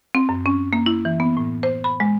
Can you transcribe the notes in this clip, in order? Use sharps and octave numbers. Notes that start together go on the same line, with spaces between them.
C4
F#2
C#4
A#3
E4
E3
B3
A2
C5
B5
G#3